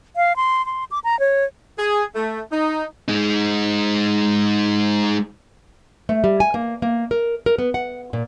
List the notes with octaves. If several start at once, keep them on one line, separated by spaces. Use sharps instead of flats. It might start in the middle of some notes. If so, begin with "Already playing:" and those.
F5
C6
C6
D6
A#5
C#5
G#4
A3
D#4
G#3 D#4
A3
G3
G#5
A#3
A#3
A#4
A#4
B3
F#5
A#2